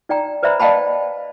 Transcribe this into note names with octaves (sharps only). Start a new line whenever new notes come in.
D#4 D5 G5 A#5
B4 C5 D5 E5 A#5 B5
D5 D#5 F5 G5 A5 B5